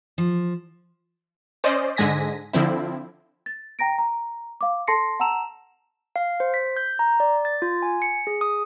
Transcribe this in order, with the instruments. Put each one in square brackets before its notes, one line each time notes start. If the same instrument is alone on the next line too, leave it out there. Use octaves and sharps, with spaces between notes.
[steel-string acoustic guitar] F3
[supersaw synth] C#4 C5 D5 D#5
G#2 D3 G#3 G#5 A#6 B6
D3 F3 C4 E4
[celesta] A6
G5 A#5 A#6 D7
A#5
F5 D6
A4 A5 C6 A#6 C7 C#7
F#5 A5 A#5 E6 E7 F7
[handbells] F5
C5
B6
G6
A#5
D5
A6
F4
G#5
C#7
G#4
D#6